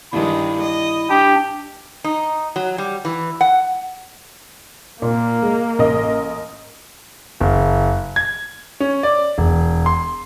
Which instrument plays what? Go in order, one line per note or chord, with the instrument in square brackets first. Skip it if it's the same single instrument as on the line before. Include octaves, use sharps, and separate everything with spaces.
[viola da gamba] G2 D#3 G#3 [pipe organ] E4
[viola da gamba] D#5
[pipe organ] D4 [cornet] G4
[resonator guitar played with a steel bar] D#4
F#3
G3
E3
F#5
[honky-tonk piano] A#2 [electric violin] A#3
[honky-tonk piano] G#3
A1 A#4 D#5
[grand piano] F#1
G#6
C#4
D5
E1
C6